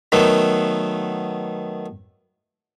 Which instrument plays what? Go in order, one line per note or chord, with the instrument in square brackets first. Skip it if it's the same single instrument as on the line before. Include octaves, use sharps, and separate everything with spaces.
[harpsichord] D#3 F#3 A3 B3